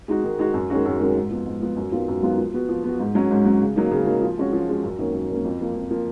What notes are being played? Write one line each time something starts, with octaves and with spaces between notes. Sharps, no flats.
G#3 D#4 F#4
D#3
G#3 D#4 F#4
F#2
D#3 G#3 C#4 F#4
F#2
D#3 G#3 C#4 F#4
G#2
F3 B3
G#2
F3 B3
F#2
D#3 F#3 B3 F4
F#2
D#3 F#3 B3 F4
F3
B3 F#4
F3
B3 F#4
G#2
F#3 C#4
G#2
F#3 C#4
C#3
F#3 A#3 D#4
C#3
F#3 A#3 D#4
F3
G#3 C#4 F#4
F3
G#3 C#4 F#4
F#2
D#3 A#3 C#4
F#2
D#3 A#3 C#4
F2
F3 A#3
F2
F3 A#3